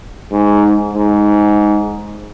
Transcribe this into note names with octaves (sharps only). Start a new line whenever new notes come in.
G#2
G#2